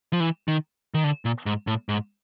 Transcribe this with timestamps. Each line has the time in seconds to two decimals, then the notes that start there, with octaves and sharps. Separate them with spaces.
0.13 F3
0.20 E3
0.48 D#3
0.94 D#3
1.04 D3
1.25 A#2
1.46 G#2
1.67 A2
1.89 G#2